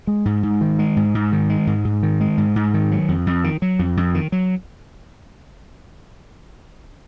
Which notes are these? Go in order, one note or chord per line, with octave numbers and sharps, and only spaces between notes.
G#3
G#2
G#2
D#3
G#3
G#2
G#2
D#3
G#3
G#2
G#2
D#3
G#3
G#2
G#2
D#3
F#3
F2
F2
D#3
F#3
F2
F2
D#3
F#3